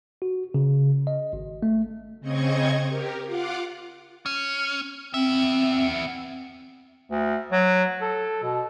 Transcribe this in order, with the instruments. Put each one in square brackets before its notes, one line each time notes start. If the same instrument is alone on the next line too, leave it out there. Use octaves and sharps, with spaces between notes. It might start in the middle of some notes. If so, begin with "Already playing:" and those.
[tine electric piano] F#4
C#3
D#5
G#1
A3
[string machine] C#3 C4 D#5 C#6 G#6
G4 A#4
F4 F5 F#5 D6
[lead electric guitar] C#4
[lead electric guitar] B3 E5 [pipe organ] C4
[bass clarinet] D2
F#3
A4
B2